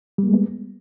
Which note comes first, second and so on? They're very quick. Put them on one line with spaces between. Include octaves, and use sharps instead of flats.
G3 A#3 G#3 B3